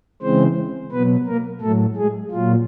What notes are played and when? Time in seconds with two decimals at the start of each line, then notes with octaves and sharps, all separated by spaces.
0.22 C#3 E3 G#3 C4 C5
0.92 B2 F#3 B3 B4
1.27 A#3 A#4
1.61 A2 F#3 A3 A4
1.96 G#3 G#4
2.31 A#2 F#3 F4